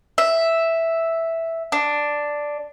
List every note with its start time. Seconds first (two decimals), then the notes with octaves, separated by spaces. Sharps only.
0.18 E5
1.72 D4